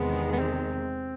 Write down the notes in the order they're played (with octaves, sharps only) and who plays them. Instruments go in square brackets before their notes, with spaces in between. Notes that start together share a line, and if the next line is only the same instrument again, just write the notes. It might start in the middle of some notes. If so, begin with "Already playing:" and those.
Already playing: [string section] E2 C3 D#3 G#3 [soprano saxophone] B3
[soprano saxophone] B3
C4